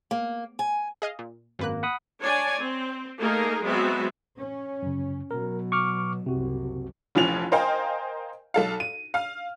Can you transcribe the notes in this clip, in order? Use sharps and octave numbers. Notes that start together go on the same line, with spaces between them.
A#3
G#5
G#4 D#5 F5
A#2
G#1 F#2 A#3 B4 F#6
F#5 B5 D#6
D4 C#5 D5 G#5
C4
A3 A#3 D#4 G#4 A#4
F#3 G#3 B3 C4 F#4 E5
C#4
F#2 C#3
B2 F#3 A#4
C#6 D6 F6
F#1 C2 C3 F#4
F1 A#1 E3 F3 C#4 F7
A#4 C5 D#5 F5 G5 G#5
B1 A4 F5
D#7
F5 F6